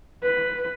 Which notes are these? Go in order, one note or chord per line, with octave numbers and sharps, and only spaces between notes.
B4